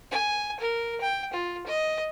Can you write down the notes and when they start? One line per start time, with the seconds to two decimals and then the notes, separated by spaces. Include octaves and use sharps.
0.11 G#5
0.60 A#4
1.01 G5
1.34 F4
1.67 D#5